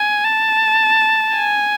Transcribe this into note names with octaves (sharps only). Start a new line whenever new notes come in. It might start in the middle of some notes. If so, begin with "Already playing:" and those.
Already playing: G#5
A5
G#5